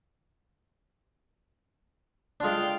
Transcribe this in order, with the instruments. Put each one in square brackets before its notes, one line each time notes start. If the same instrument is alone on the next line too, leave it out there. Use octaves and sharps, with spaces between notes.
[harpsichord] G#3 D4 [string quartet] F4 F5 G5